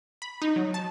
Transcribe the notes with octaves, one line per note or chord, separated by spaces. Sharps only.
B5
D#4
F#3
A5